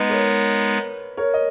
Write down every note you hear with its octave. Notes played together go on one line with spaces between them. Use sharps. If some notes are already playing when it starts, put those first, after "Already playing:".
Already playing: G#3 B3 D#4 B4 D#5
A#4 C#5
A#4 C#5
D#5